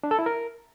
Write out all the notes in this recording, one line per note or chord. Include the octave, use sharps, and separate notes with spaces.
D4
A4
E4
A#4